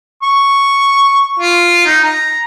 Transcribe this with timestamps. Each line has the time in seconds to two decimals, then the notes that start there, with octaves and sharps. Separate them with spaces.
0.23 C#6
1.39 F4
1.86 D#4
2.04 A#5